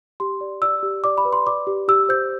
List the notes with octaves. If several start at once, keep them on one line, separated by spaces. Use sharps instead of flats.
G4 C6
D5
D5 E6
G4
D5 D6
B5
B4
C6
D5 D6
G4
G4 E6
C5 G6